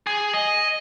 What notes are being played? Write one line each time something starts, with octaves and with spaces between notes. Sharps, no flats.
G#4
D#5